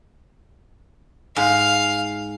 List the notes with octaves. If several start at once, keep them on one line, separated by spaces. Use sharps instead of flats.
G#2 F5